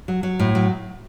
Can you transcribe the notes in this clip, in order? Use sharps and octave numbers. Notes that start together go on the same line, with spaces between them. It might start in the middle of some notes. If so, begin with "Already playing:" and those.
F#3
F#3
A2
F#3